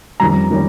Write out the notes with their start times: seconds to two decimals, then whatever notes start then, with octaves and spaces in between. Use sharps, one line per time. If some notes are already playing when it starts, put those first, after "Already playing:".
0.20 F2 D#3 G3 C#4 A#5
0.51 D#3 G3 C#4